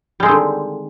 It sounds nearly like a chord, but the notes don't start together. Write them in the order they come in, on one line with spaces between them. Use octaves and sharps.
G3 G#3 C4 D#3 D3